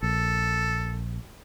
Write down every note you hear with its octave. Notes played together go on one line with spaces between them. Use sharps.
A#1 A4